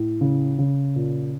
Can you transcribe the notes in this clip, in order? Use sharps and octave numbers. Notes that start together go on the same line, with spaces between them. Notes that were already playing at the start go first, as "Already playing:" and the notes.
Already playing: A2
C#3
C#3
A#2